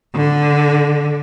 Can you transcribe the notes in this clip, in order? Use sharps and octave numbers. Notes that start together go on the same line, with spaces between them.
D3